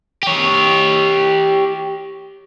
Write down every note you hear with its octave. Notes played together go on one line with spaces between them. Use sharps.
G4 C#5